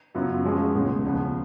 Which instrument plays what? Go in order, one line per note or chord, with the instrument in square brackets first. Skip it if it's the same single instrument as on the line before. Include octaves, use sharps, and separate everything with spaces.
[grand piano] F#2 C#3 F#3 B3 F4
F3 G#3 C#4 G#4
C#2 B2 G#3
D#2 C#3 F3 B3